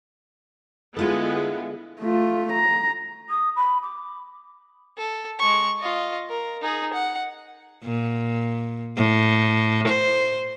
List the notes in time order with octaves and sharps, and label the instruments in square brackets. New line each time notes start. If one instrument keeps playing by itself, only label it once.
[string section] D3 G#3 B3 [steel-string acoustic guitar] E4 F4 A4
[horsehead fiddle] A3 F4
A#5
[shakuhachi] D#6
B5
D6
[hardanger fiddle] A4
G#3 C#6
F4 D#5
A#4
D#4 G#4
F#5
[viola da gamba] A#2
A2
C5